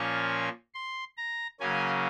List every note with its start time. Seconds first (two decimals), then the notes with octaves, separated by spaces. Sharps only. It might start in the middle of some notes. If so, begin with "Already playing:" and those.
Already playing: A#2 F3 A#3 C#4 C#6
0.74 C6
1.17 A#5
1.60 C#3 F#3 A#3 C#4 G#5